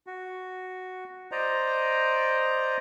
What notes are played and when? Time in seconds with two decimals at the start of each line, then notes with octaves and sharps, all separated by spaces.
0.07 F#4
1.32 C5 D5 D#5 A#5